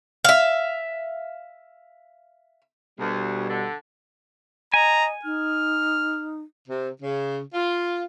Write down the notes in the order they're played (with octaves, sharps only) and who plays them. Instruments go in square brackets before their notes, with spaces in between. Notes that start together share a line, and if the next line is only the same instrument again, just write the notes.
[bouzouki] E5 F5
[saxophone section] D2 [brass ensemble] B2 G3
[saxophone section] D3
[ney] D#5 [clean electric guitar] G#5 [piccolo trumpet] A#5
[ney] D#4 [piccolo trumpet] F6
[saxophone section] C3
C#3
F4